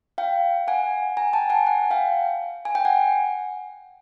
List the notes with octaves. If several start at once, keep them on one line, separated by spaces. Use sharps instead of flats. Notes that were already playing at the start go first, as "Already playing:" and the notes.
F5 G5
F#5 G#5
G#5 A#5
G5 A5
F#5 G#5
F#5 G#5
F5 G5
G#5
G5
F#5 G#5